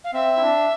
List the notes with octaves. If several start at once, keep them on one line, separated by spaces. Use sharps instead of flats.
F5
C4 E5
E4
D4